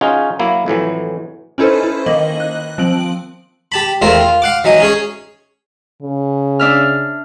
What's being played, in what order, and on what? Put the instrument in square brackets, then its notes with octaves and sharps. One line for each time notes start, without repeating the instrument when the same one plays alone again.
[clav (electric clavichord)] C#4 D#4 F4 F#4 G#4
F#3 A#3 E4
F2 A2 E3 F#3
[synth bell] C#4 D#4 E4 A4 B4 C5
E4 C5
D#3 A#3 D#5 F#7
F#6
F3 C4 D7 F#7
[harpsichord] G4 A5 B5
E2 A3 C4 F4 A#4
F4
F5 F#5 D6
E3 F#3 D#4 D#5
C#4 G#4 C#5
[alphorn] C#3
[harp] D4 E5 F6